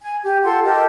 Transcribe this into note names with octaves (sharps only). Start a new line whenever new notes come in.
G#5
G4
F4 A4 F#5 C6
G4 A4 A#4 D#5